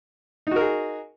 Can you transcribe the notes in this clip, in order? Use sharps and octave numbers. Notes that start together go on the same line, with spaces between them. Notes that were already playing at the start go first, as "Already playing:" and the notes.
D#4 F#4 G#4 A#4